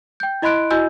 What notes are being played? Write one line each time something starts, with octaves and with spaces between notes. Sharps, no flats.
G5 G6
E4 D#5 B5 C6 F#6 D7
E4 F#4 D#5 G#5 E6 G6